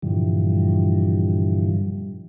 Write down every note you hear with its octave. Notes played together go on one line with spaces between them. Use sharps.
G2 A#2 D3 E3 F3 G3